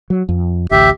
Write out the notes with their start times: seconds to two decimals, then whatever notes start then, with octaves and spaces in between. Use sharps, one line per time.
0.10 F#3
0.29 F2
0.71 A1 D2 G4 E5